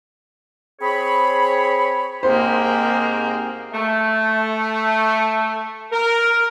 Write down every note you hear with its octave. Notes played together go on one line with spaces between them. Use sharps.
C4 G#4 C#5 B5
G#2 A#3 C4 G4 G#4 A#4 C5 G5
A3
A#4